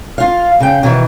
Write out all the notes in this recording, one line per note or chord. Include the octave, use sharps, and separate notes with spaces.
F4 F5
C#3 G5
B2 D#3 E3